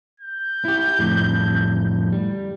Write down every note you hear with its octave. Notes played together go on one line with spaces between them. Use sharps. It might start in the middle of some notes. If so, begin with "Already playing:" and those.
G6
E4 G4
F2 A2 D3
G3